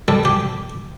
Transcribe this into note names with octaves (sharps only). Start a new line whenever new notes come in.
G3 A4
G4